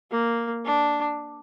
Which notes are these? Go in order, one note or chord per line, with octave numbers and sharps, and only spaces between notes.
A#3
D4